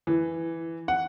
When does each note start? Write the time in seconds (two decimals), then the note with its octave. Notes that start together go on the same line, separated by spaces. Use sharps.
0.07 E3
0.88 F#5